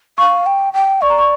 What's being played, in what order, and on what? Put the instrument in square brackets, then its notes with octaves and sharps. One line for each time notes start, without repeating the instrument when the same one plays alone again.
[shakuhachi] F5 [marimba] C#6
[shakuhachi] G5
G5
[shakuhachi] D5 [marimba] C#6
[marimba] A#5
C#6